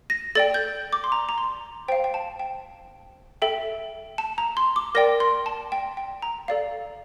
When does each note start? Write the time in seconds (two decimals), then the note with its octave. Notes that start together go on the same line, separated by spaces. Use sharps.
0.10 A#6
0.35 A4 D5 G5 A6
0.54 G6
0.93 D6
1.04 C6
1.12 A#5
1.29 A#5
1.38 C6
1.88 C5 G5
1.92 F5
2.04 G5
2.14 A5
2.40 G5
3.42 A4 E5 G5
4.18 A5
4.38 A#5
4.57 C6
4.76 D6
4.95 A#4 D5 G5 A#6
5.20 C6
5.46 A5
5.72 G5
5.97 G5
6.22 A#5
6.48 A4 D5 F5